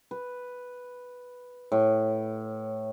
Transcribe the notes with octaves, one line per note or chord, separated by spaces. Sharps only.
B4
A2